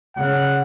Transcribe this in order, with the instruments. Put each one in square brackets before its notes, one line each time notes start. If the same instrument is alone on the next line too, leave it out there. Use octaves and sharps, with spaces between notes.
[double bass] C#3 [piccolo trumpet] F#5